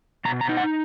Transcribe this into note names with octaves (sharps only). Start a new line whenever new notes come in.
B2 A#5
A#5
D#4
F#5